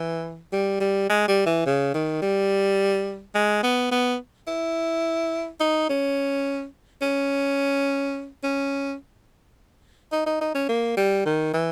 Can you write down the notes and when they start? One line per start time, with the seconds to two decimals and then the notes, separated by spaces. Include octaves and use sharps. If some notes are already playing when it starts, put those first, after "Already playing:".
Already playing: E3
0.53 G3
0.80 G3
1.10 G#3
1.28 G3
1.46 E3
1.66 C#3
1.94 D#3
2.22 G3
3.35 G#3
3.63 B3
3.91 B3
4.48 E4
5.60 D#4
5.89 C#4
7.02 C#4
8.44 C#4
10.12 D#4
10.26 D#4
10.41 D#4
10.55 C#4
10.69 A#3
10.97 G3
11.26 D#3
11.54 E3